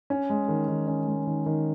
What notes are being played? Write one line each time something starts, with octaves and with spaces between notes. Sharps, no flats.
C#4
G#3
D#3
D#3
C#4
G#3
D#3
D#3